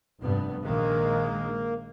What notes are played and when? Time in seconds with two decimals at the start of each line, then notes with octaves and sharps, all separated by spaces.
0.19 F1 G2 B3
0.64 A#1 D#3 G#3 A#3